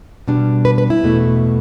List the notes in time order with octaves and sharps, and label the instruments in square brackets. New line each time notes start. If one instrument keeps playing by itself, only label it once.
[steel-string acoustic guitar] B2 G3 D4
B4
B4
E4
E2 B2 A3